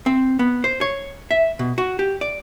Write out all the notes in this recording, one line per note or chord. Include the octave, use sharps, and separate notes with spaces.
C4
B3
C5
C#5
E5
B2
F#4
G4
D5